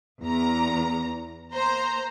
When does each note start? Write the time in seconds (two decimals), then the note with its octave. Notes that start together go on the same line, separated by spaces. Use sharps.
0.23 E2 A#5
1.53 A#3 C5 A#5